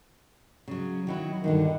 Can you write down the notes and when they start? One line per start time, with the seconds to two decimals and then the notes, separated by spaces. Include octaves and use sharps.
0.68 C#3 F#3
1.07 D#3 F#3 E4
1.44 G2 B2 D3 D#3